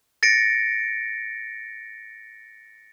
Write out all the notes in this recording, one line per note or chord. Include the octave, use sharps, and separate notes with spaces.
A6 A#6 C#7 D7